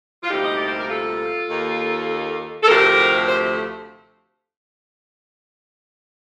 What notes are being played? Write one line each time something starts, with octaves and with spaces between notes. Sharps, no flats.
F4
D2 C3 G3 A#3 D#4 G4
D#5
D5
C5
A#4
F4 A4
D#2 D#3 A#3
A4
D2 C3 F3 A3 G4 A#4
C5